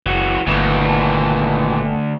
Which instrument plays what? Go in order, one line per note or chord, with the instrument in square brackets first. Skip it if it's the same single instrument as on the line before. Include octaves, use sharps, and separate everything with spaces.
[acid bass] F#1 [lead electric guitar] E3 F#4
[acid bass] G1 [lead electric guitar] D2 [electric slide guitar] A#2 D#3 E3